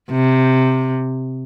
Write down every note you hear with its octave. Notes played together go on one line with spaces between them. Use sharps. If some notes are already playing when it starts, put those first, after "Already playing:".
C3